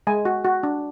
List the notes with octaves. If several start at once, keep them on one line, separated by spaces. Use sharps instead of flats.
G#3 G#5
F#4
F#4
D4